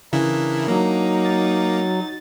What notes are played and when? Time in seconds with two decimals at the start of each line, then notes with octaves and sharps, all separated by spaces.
0.13 C#3 E3 D4 E4 A#4
0.68 F#3 A#3 D#4
1.24 A6